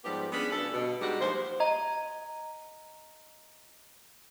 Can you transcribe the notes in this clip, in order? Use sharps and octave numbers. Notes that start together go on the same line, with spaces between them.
G#2 F3 G3 B3 G4
B3 C#4 D4 G#4 B4
D2 G2 A4
B2
G3 G#3 D4 D#4 F#4 G4
D#2 D#3 F3 C5
D#5 A#5